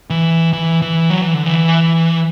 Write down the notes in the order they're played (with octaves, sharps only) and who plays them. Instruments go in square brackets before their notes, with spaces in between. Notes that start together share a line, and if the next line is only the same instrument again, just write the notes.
[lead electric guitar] E3
E3
E3
F#3
E3
D3
E3